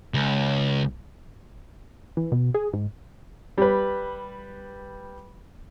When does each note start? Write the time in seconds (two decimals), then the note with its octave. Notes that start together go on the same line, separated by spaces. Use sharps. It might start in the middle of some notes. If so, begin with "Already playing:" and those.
0.14 C#2
2.17 E3
2.32 B2
2.54 G#4
2.73 G#2
3.58 G3 B4